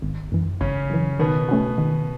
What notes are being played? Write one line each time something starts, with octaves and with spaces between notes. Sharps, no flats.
G#1
F#2 E3
G#1 C#3 C#4
F#2 E3
B2 D#3 B3
A3 C#4 F#4
D#3